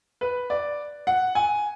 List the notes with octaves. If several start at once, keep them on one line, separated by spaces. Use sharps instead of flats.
B4
D5
F#5
G#5